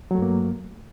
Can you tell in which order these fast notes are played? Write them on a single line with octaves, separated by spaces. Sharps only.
F#3 A3 G2 A#3